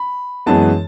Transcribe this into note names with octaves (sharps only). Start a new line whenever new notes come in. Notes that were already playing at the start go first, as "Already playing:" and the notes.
Already playing: B5
F#2 E3 G#3 B3 A5